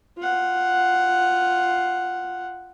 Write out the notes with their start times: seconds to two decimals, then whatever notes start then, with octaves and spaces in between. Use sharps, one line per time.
0.18 F4 F#5